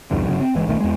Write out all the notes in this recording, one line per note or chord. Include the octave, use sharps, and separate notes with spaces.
B1 E2 G2 D3
G1 C#3 F#3
C4
G1 E3 G#3
D#1 B1 D#3 A3
E2 G#3